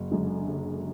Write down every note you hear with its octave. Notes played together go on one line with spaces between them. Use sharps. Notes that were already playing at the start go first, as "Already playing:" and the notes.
Already playing: F#1
F#2 D3 G#3
F#1